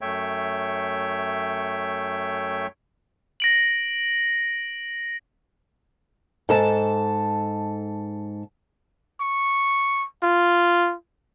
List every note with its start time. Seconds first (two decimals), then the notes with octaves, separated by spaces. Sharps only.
0.01 F#2 A3 C#5 E5 G5
3.40 A#6 D7 F#7
6.49 G#2 A4 A5
9.21 C#6
10.23 F4